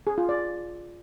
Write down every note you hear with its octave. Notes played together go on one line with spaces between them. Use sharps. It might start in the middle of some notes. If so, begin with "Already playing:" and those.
G#4
F4
D5